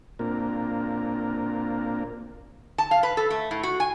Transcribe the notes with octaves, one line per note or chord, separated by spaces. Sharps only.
A#2 A#3 C4 D4 F4 A#4
A5
F5
B4
A4
A3
A2
F#4
G#5